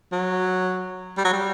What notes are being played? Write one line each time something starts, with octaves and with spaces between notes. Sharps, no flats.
F#3
G3
F#3
G3